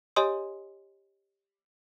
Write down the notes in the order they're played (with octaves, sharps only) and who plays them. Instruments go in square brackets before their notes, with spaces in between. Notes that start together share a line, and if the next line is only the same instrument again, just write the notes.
[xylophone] G4 C#5 D#5 G#5 C6 D#6